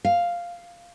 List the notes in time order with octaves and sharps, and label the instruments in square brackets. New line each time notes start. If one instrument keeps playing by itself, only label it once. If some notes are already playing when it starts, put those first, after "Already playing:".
[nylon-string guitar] F5